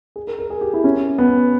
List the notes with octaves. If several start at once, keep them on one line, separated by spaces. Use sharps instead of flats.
G#4
A#4
A#4
G#4
G4
E4
C#4
B3